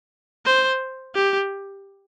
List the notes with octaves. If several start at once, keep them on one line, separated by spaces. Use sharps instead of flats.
C5
G4